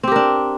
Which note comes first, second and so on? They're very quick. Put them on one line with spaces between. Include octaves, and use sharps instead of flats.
C4 G4 A#4 D4